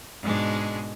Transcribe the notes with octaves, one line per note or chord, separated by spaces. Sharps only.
G#2 B2 G#3 D4